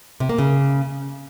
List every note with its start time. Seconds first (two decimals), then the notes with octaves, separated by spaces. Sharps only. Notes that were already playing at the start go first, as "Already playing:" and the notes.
0.20 C3
0.29 A#3
0.38 C#3